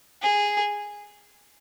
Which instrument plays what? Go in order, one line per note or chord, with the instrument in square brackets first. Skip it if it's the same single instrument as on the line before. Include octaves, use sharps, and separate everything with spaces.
[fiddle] G#4